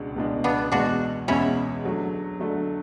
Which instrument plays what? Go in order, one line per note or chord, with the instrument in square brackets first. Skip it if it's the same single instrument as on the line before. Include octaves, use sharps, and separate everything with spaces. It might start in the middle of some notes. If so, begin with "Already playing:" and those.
Already playing: [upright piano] C#2 B2 G#3 D4
C#2 B2 G#3 D4
[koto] B3 D4
[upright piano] E2 B2 G#3 [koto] D4 F#4
[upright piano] E2 B2 G#3 [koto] C#4 E4
[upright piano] D3 F#3 A3
D3 F#3 A3